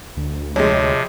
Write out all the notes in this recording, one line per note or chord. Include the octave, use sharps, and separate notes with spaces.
D2
F2 C3 G#3 C#5